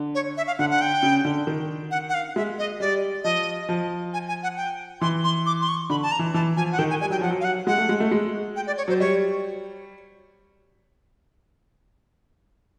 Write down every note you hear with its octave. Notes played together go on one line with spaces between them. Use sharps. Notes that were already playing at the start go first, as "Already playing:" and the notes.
Already playing: D3
C#5
E5
F5
D3 F#5
F#5
G5
C#3
D3
D#3
F#5
F#5
F5
G#3 E5
D#5
G3 D5
F3 D#5
F3
G#5
G#5
F#5
G5
E3 C6
C6
D6
C6
C#6
D3 B5
A5
A#5
E3
E3 A5
F3 G#5
F#5
D#3 G5
G#5
G3 G#5
F#3 G5
F3 F#5
F#3
F5
F#5
G#3 F#5
A3
G#3
A3
G#3
G5
D5
C#5
F#3 C5
G3 C#5